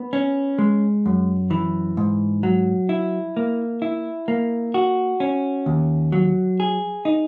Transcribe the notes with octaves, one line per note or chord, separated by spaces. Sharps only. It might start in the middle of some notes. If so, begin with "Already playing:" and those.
Already playing: B3
C#4
G#3
F#2
E3
G#2
F#3
E4
A#3
E4
A#3
F#4
C#4
D#2
F#3
G#4
D#4